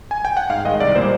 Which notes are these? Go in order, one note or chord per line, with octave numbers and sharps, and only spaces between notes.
G#5
G5
F#5
G#2 F5
D#3 G#3 D#5
C2 D5
A#2 G3 A#3 C5